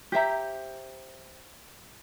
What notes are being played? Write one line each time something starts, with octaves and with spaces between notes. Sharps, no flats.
G4 C5 E5 A#5